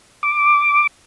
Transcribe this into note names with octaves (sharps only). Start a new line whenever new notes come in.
D6